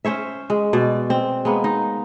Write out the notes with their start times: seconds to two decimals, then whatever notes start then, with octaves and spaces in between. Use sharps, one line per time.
0.05 C#4 C5 C#5 E5
0.50 G#3
0.73 B2 D5
1.10 C4
1.45 G#3 A#3 B3
1.64 D#4